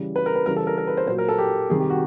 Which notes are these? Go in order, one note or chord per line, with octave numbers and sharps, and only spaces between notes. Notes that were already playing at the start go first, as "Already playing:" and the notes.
Already playing: C#3 E3 G3
B4
A#4
B4
C#3 E3 G3 A#4
A4
A#4
A#4
B4
C5
A#2 F#3 C5
A#4
A4
G4
C3 D#3 G3 G#4
G4
F#4